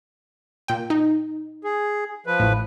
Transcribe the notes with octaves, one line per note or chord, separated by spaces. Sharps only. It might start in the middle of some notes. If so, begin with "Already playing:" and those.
A#2 G5
D#4
G#4
F3 B4
A1 A2